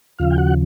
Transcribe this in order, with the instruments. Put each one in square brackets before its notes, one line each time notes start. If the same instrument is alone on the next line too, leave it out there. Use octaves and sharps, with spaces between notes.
[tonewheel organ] D#2 C#3 F3 F4 F5
G5
F#4 F#5